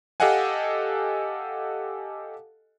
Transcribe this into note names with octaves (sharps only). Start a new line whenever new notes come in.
G4 A4 D#5 F5 F#5 G#5